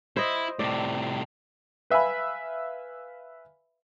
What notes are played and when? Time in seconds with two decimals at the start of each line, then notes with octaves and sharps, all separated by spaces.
0.17 E4 C5 D#5
0.59 A2 C3 D5
1.90 B4 E5 F5 G#5 B5